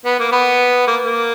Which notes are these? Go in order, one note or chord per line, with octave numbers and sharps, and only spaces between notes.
B3
A#3
B3
A#3
A#3